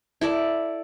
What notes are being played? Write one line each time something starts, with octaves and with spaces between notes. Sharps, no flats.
E4 A4 D5